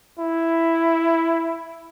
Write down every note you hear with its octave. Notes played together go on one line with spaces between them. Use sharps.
E4